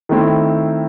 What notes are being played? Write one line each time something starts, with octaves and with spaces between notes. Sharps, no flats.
D#3 A3 C4 E4